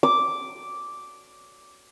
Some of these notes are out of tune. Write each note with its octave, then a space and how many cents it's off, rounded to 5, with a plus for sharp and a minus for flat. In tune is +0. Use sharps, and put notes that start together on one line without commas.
D6 -5